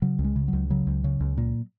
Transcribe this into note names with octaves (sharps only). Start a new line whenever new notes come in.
C#3 F#3
C#2
G#3
C#3
C#2 F#3
C#3 F#3
C#2
C#3
C#2
A#2